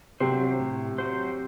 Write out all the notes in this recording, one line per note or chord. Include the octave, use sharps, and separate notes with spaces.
C3 F#3 C4 F#4 C5
A2
F#3 C4 F#4 C5